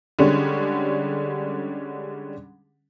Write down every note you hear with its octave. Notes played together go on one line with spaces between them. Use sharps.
D3 G3 G#3 C#4 D4